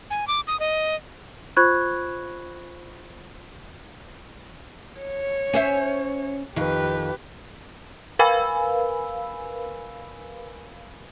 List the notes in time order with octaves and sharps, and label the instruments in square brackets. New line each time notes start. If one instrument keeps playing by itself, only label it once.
[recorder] G#5
D6
D#6
D#5
[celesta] F4 C5 B5 C#6 F#6 G#6
[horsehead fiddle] C#5
[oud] C#4 C5 E5
[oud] F2 D#3 [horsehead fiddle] G4 B4
[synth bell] A#4 B4 F5 G#5 B5 E6